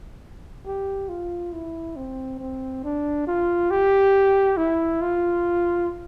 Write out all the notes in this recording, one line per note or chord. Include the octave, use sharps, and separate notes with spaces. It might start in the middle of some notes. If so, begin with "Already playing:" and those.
G4
F4
E4
C4
C4
D4
F4
G4
E4
F4